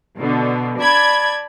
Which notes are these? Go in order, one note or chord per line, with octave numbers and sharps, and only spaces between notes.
B2 D3
D5 A5 B5 G#6